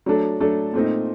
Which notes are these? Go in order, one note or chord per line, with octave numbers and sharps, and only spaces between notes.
F#3 A3 D4 A4
F#3 A3 D4 A4
A#2 A3 C4 D#4